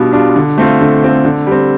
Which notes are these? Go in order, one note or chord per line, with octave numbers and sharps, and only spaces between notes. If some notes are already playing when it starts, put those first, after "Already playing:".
Already playing: B2 G3 D4 F4
G3 D4 F4
D3
A3 C4 F4
D3
A3 C4 F4
D3
G3 C4